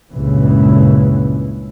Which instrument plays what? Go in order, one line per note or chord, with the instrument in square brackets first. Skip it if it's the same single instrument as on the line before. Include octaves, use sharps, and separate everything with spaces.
[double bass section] C#2 G2 A#2 C#3 E3